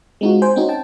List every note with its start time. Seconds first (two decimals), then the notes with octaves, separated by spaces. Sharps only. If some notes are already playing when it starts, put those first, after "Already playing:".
0.21 G#3 C4 D#4 F4 F#4
0.42 C5 G5 G#5
0.56 C4 C#4 D#4 F#4
0.69 G5 A5